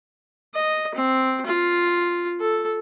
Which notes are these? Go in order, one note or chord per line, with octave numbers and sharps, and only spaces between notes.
D#5
C4
F4
A4